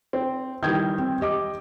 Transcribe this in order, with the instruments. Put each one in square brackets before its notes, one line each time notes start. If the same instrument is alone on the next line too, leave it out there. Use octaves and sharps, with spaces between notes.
[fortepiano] C4
[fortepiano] D#3 E3 G3 [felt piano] G6 G#6
[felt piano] C4
G4 D#5 D6